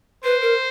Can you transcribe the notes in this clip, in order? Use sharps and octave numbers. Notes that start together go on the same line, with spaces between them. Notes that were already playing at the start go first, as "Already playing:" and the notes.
B4 C5
A#4